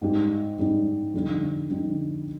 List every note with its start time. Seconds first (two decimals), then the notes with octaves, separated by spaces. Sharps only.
0.01 G#2 G3 C4 D#4 G4
0.58 G#2 G3 C4 D#4 G4
1.14 F2 D3 G3 C4 D#4
1.70 F2 D3 G3 C4 D#4